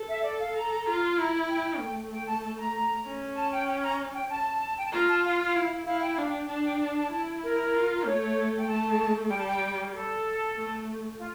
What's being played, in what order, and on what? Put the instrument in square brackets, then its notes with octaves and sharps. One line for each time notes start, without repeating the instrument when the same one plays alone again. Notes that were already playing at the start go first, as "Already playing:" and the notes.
Already playing: [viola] A4
[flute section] E5
D5
F5
A#5
[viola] F4
[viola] E4 [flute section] A#5
[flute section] G5
[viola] A3
[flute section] G5
A5
A5
A#5
[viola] C#4
[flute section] A5
G5
G5
A#5
G5
A5
G5
A5
[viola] F4 [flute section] A#5
[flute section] A5
F5
[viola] E4
[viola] E4 [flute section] F5
[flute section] G5
[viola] D4 [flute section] F5
[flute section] G5
[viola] D4 [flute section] A5
[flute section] G5
A5
A5
[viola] E4 [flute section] A5
[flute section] A#4
[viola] F4
[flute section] A#4
[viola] A3 [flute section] C#5
[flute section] G5
[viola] A3 [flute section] A5
[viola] G3 [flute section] G5
[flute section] A5
G5
A4
[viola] A3
[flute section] F4